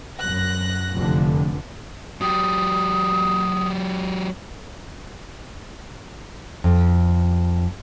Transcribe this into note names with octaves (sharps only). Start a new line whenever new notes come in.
F#2 F#6 A#6
F1 D3
F#3 G4 D#6
F2